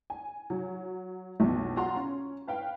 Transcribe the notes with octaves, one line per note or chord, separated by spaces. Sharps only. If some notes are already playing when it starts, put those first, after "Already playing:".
G#5
F#3
B1 F2 B3
F4 F#4 A#5 C6
C#4
B4 F5 G5